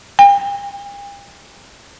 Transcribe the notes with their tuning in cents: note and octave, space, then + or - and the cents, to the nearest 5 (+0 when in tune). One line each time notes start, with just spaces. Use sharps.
G5 +45